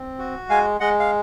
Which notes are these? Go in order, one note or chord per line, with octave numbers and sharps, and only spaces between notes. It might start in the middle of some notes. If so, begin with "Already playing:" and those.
Already playing: C4
F#4
G#3 F5 G#5
G#3 D#5 F#5
F5